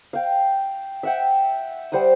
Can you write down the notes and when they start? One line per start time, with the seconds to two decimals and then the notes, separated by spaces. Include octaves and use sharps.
0.13 F5 G5
1.03 E5 F#5 G5
1.92 G3 C5 F#5 D#6